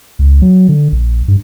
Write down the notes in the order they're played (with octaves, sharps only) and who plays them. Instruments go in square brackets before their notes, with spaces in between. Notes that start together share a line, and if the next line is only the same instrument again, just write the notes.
[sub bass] C#2
F#3
D3
A#1
G2